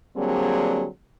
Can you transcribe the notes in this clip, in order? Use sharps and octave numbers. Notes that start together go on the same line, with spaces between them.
D3 F#3 G3 A#3 C4 G#4